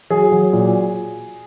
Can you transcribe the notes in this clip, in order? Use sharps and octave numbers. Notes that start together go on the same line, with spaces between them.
F#3 G#4
F#3
A#2